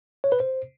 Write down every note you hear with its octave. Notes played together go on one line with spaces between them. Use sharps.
C#5
B4
C5